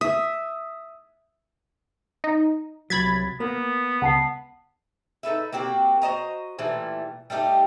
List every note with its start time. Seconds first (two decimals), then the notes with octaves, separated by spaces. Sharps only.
0.01 E5 D#6
2.24 D#4
2.90 C2 F#3 B5 G#6 A6 B6
3.40 A#3 B3
4.02 C#2 F#5 A5 C7
5.23 D#4 A4 B4 E5
5.53 A#3 C4 F#4 G4
6.02 F#4 C5 D#5 A#5
6.58 A#2 E3 G3 A3
7.30 G3 A3 D#4 G4